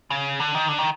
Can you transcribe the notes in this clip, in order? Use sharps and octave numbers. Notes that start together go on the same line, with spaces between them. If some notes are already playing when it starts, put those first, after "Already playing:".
C#3
D3
D#3
D3
D#3